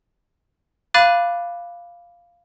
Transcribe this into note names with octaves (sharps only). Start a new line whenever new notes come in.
F5 B5 D6 F#6 A6 D#7